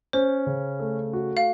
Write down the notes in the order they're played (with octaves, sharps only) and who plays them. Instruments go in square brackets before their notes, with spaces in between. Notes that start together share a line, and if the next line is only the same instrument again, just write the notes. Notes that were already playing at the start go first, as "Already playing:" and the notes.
[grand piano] C#4 [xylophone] C5
[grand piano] C#3
A3
F#4
[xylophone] F5